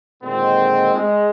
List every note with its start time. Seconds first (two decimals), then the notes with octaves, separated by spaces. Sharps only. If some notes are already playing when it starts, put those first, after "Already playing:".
0.23 A#2 D3 D#3 G#3 C4
0.93 G#3